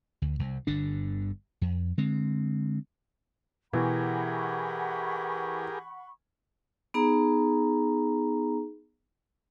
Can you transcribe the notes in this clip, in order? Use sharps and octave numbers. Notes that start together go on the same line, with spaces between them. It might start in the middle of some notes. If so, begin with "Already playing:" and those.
D2
C2
G1 G2 D3 D4
F2
D3 G#3 C4
B2 E3 G4 G#4 A#4 F#5 B5 C#6
B3 D#4 G#4 A#5